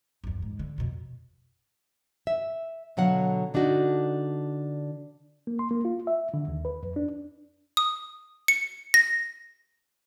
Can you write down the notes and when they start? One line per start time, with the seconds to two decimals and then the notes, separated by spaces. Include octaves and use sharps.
0.24 G1 E2
0.42 G#2
0.59 D3
0.78 F2 B2
2.27 E5
2.97 B2 D3 F#3 F5 F#5
3.54 D3 D4 D#4 F#4
5.47 A#3
5.59 C6
5.71 A#3
5.85 F4
6.07 E5
6.34 D3
6.48 D#2
6.65 B4
6.83 F2
6.96 D4
7.77 D#6
8.48 C#7
8.94 A#6